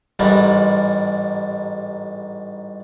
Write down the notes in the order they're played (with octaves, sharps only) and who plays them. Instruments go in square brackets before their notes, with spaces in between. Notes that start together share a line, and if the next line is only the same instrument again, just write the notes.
[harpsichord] A1 G#2 G3 A#4 A5 B5